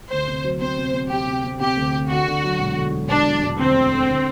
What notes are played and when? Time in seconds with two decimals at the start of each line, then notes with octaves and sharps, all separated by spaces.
0.11 D2 C5
0.28 C3
0.44 F#3
0.61 C4 C5
0.78 C3
0.94 C4
1.11 C4 G4
1.27 C3
1.44 C4
1.61 C3 G4
1.76 D2
1.93 D2
2.10 D3 F#4
2.27 D3
2.44 F#3
2.60 E1
2.76 D3
2.92 F#3
3.09 E1 D4
3.26 F#3
3.42 E1
3.59 D2 C4
3.75 D2
3.92 D3
4.08 D3